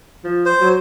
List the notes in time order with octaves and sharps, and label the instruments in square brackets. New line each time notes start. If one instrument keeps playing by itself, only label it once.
[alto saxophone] F3
[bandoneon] C5
[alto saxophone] F#3